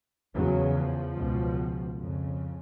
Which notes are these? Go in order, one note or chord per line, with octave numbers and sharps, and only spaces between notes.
E2 C#3 F#3
F3
C#2 B2
F2 C#3